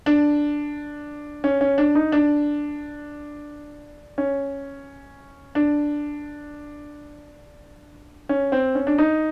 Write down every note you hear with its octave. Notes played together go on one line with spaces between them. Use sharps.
D4
C#4
C#4
D4
D#4
D4
C#4
D4
C#4
C4
C#4
D4
D#4